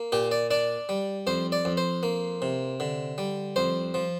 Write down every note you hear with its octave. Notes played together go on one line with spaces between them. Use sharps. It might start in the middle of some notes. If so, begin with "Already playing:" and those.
Already playing: A#3
A#2 G4
D5
D4 D5
G3
F2 C5
D5
F2
C5
A#3
C3
D3
G3
F2 C5
F3